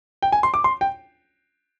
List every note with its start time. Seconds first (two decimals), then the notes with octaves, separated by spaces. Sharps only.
0.22 G5
0.32 G#5
0.43 C6
0.54 D6
0.64 C6
0.81 G5